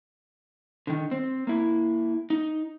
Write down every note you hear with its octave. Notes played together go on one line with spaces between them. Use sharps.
D3 D#3
C4
A#3 E4
D#4